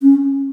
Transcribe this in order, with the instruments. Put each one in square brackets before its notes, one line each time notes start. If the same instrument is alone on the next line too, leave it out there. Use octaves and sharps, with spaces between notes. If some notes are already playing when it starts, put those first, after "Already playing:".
[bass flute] C#4